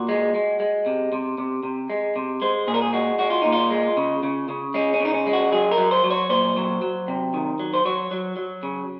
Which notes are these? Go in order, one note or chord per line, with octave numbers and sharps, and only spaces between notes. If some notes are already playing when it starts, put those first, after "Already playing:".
Already playing: A#2 F#4
G#3
G#3
G#3
C3
C3
C3
C3
G#3
C3
G#3 C5
A#2 G#4
A#4
G#4
G#3 F#4
G#3 F#4
F4
A#2 D#4
F4
G#3
C#3
C#3
C#3
G#3 C#4
C#4
C#3 D#4
C#4
G#3
F#4
F#3 G#4
A#4
F#3
C5
F#3
C#5
A#2 C5
F#3
F#3
C3
D#3
F#3
C5
F#3 C#5
F#3
F#3
C#3